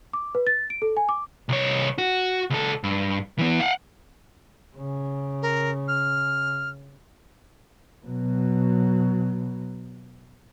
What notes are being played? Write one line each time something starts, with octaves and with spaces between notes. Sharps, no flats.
D6
B4
A6
D7
A4
G#5
D6
C2 C#5
F#4
C#2 A4
G2
E3 B3
F5 F#5
C#3
A#4
F6
B2 F#3